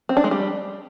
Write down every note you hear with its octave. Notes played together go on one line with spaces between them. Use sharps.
C4
D4
G#3
G3